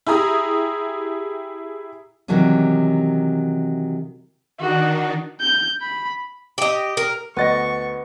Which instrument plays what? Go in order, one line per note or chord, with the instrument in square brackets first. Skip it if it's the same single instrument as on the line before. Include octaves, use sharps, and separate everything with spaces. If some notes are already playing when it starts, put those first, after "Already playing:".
[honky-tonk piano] E4 G4 G#4 A#5 D#6
[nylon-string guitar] C3 D#3 E3 F#3 G3 C#4
[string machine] D#3 D4 D#4 [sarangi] F#4
[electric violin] G6
B5
[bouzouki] G4 D#5
A#4
[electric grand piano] D2 A6 A#6 [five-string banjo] B3 D#5 [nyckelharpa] C#6